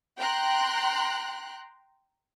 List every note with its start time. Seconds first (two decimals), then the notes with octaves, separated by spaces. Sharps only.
0.18 G5 A#5 C6 F#6